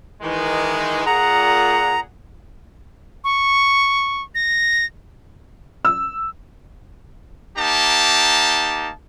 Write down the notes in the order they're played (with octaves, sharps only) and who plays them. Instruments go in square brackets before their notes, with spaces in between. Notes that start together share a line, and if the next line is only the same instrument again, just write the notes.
[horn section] D#3 E3 G#3
[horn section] A#2 G#4 F#5 [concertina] A#5
[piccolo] C#6
A#6
[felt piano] E6
[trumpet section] A#3 D#4 G4 A5